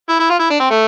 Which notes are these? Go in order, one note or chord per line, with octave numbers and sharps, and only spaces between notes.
E4
E4
F4
E4
D4
C4
A3